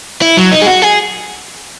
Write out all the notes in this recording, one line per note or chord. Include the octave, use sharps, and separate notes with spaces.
E4
F#3
D#4
G#4
F#4
G#4